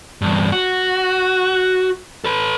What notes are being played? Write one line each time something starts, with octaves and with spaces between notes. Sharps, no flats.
E2 G2
F#4
A4 B4